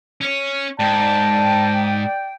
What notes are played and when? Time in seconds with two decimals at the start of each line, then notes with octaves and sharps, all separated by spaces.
0.21 C#4 C#5
0.80 G#2 D5 G5 A5